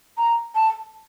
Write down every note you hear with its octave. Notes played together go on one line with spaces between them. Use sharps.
A#5
A5